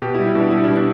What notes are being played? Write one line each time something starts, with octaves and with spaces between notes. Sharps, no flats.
B2 G4
E4
G3
E4
B2 D4
G3 E4
D4
B2
D4